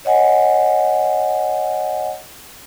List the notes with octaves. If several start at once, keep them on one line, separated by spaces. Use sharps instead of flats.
C#5 D#5 F#5 G#5